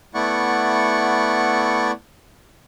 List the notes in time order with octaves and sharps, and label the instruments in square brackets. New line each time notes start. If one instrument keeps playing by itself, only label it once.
[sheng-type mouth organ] A3 B3 E4 D5 F#5 C#6